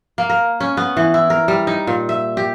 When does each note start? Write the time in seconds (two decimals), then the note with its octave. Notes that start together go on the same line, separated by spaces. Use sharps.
0.18 A#3
0.29 A#4
0.60 C#4
0.77 B3
0.97 E3
1.14 E4
1.30 A#4
1.48 G3
1.67 D#4
1.87 A#2
2.09 E5
2.37 G4